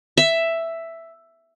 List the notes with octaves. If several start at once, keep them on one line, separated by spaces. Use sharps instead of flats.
E5